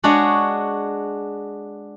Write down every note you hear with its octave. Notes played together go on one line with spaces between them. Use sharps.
G#3 D4 F#4 G#4 C#5 G#5